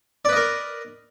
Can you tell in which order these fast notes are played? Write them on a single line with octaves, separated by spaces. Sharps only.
D5 B4 D#5 A#4